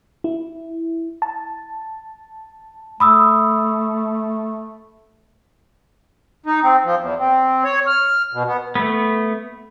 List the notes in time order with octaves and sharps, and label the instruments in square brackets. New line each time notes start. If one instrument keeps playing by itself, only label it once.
[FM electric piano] E4
A5
[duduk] A3 [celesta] B5 D#6 E6
[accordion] D#4
C4
F3
E2
C4
C#5
F6
B2
B3
[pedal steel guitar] A3 B3